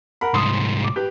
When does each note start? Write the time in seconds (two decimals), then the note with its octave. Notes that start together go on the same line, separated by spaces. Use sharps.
0.21 A#4 F#5 B5
0.34 C2 G#2 C6 D#6
0.84 D6
0.96 G4 B4